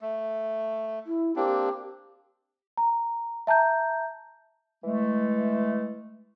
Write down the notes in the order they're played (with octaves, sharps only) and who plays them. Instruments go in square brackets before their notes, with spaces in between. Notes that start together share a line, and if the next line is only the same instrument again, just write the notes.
[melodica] A3
[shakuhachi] E4
[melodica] A#3 C4 D4 [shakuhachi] G4
[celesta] A#5
E5 A5 A#5 G6
[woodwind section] E3 G#3 A3